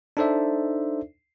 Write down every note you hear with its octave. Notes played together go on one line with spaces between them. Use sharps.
D4 D#4 A4 C5 D5 E5